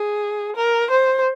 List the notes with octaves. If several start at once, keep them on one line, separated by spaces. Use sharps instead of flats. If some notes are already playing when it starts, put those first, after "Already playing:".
Already playing: G#4
A#4
C5